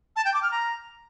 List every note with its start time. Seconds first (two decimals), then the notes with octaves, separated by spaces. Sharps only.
0.16 A5
0.25 G5
0.34 D6
0.43 F6
0.51 A#5